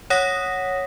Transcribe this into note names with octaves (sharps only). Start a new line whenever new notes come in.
C#5 F#5 D#6 A#6 B6